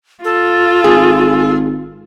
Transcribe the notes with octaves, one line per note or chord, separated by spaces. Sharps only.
F4 A4
G#1 G#4